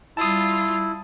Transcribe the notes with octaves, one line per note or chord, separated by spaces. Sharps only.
G3 E4 F4 A5 D#6